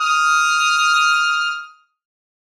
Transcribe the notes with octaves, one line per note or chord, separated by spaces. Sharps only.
D#6 F6